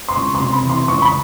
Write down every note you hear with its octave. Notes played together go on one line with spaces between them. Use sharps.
C6
C#2 C#6
C6
C3
C6
B5
E3
C6
C#2 C#6
B5